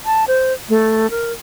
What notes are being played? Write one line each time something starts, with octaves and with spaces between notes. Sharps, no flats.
A5
C5
A3
A#4